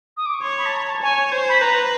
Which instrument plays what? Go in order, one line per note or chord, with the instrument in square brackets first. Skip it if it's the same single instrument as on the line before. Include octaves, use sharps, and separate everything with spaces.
[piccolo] D#6
D6
C#6
[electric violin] C#5 [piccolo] C6
[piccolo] B5
A5
A#5
A5
[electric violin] C#5 [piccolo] G#5
[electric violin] C5
[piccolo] B5
[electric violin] B4 [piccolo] A#5